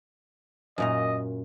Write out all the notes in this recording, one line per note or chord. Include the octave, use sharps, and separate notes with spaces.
F#2 A#2 D#5 A#5